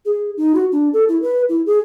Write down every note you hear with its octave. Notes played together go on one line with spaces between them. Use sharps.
G#4
D#4
F#4
D4
A4
E4
B4
E4
G#4